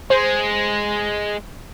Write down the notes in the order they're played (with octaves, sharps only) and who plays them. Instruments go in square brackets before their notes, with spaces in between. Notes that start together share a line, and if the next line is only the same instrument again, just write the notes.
[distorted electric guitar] G#3 [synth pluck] C5